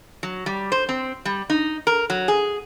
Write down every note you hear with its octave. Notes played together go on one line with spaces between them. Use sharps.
F#3
G3
C5
C4
G3
D#4
A#4
F#3
G#4